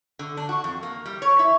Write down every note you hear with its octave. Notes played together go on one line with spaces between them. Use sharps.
D3
D4
F#4
F2
A#3
G3
C#5
E4